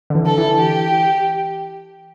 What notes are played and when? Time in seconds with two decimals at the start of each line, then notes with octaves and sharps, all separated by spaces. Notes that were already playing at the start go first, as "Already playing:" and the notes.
0.10 D3
0.15 E3
0.26 A4
0.38 E3
0.59 G4